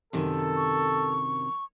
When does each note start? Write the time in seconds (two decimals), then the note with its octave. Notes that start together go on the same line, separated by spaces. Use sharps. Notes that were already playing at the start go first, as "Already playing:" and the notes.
0.13 F#2 C3 D#3 A4
0.56 C#6